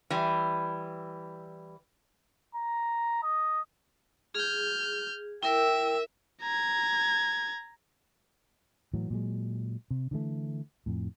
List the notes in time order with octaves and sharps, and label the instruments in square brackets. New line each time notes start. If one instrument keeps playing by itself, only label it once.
[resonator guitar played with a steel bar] E3 G3
[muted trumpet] A#5
D#5
[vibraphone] G#4 [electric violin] F6 G6
[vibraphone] E4 A#4 E6 [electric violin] E5 [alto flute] G5
[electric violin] A#5 G#6
[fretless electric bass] A2 E3 F#3
A#2 F#3 G#3
C3
D3 E3 A3
F2 A2